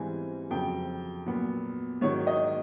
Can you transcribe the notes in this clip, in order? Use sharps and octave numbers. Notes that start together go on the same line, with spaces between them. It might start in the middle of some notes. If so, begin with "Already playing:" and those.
Already playing: G#2 E3 G3 C4 G#5
F2 C#3 F#3 G5
A#2 F#3 B3
G#2 D#3 F#3 C#5
D#5